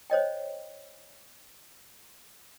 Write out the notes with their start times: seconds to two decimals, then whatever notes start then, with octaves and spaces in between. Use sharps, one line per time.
0.10 C5 C#5 D#5 G5